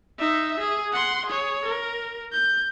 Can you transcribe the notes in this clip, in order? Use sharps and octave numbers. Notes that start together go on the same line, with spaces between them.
D#4 E5
G#4
F#5 C6
G#4 C#5
A#4
G6